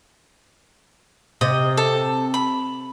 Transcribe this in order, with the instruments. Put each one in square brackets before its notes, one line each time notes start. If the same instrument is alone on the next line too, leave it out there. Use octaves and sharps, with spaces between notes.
[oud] C3 [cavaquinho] D#5
[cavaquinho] A4
B5